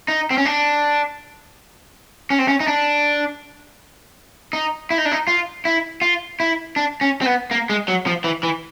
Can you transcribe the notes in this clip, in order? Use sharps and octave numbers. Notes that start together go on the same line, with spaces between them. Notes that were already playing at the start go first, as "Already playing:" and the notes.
D#4
C4
C#4
D4
C#4
C4
C#4
D#4
D4
D#4
E4
D#4
D4
D#4
F4
E4
F4
E4
D4
C#4
C4
B3
A#3
G#3
F#3
F3
E3
E3